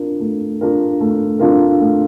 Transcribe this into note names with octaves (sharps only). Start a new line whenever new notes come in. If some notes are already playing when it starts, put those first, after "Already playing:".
Already playing: D4 F4 A#4
A3
D4 F4 A#4
A3
D4 F4 A#4
A3